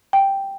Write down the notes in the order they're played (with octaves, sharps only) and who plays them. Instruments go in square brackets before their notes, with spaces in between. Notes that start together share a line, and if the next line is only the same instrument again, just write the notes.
[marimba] G5